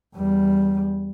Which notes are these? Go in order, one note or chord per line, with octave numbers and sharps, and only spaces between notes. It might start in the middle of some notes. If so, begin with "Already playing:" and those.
E2 G3